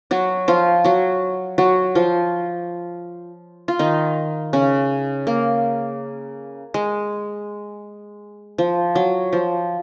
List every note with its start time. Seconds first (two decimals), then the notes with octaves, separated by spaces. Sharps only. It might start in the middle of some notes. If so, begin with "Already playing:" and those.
0.11 F#3 F#4
0.48 F3 F4
0.84 F#3 F#4
1.58 F#3 F#4
1.95 F3 F4
3.68 F4
3.79 D#3 D#4
4.53 C#3 C#4
5.27 A#3
6.74 G#3
8.58 F3
8.95 F#3
9.33 F3